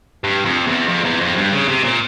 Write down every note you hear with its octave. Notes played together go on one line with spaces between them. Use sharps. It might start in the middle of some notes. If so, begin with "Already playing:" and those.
G2
F2
E2
F2
E2
F2
G2
C#3
C3
A#2